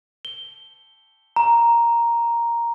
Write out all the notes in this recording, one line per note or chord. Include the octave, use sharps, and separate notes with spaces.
G7
A#5